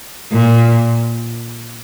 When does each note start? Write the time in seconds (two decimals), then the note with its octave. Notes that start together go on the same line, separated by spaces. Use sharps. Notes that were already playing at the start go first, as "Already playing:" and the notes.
0.32 A#2